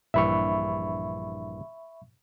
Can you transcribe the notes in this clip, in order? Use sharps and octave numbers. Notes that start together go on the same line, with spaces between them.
A#1 G2 E3 E5 B5 C#6